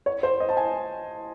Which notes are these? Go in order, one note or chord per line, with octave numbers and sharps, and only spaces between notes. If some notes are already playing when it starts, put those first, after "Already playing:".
C#5
C5
D#5
A5
G#5